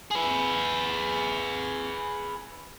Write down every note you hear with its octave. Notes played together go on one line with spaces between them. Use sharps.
G#4 B4